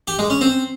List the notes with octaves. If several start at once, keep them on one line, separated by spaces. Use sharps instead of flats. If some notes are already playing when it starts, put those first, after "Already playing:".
G4
G#3
C#4
C4